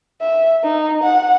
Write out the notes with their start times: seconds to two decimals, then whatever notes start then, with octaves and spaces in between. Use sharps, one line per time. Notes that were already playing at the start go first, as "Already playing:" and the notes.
0.21 E5
0.64 D#4
1.03 F#5